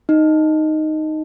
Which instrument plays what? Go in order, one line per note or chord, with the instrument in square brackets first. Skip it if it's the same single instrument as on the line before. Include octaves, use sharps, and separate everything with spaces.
[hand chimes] D#4